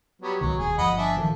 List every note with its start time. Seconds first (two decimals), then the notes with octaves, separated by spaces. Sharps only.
0.22 F#3 G3 B3
0.41 C#2 B2 D#3 F#3
0.58 D#1 D#2 G#4
0.78 G1 F3 D#5 F#5 B5
0.98 D4 E5 G#5
1.17 A2 D#3 F3 A4